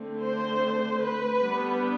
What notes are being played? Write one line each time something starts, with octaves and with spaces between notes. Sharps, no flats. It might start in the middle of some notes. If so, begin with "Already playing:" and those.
Already playing: D3 A3 C4
C5
B4
G3 B3 D4